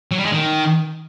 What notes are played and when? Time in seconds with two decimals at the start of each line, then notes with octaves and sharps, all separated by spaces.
0.11 F#3
0.18 G3
0.25 G#3
0.32 D#3